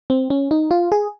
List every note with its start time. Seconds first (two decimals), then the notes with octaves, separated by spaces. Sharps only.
0.10 C4
0.30 C#4
0.51 D#4
0.71 F4
0.92 G#4